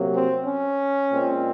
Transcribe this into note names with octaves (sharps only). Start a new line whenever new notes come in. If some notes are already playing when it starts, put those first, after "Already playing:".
Already playing: C3 F#3 A#3
C4
C#4
A#2 G#3 C4